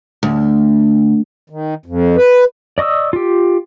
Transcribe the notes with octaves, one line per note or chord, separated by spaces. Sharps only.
D2
D#3
F2
B4
D5 D#5 C#6 D#6 E6
F4 G4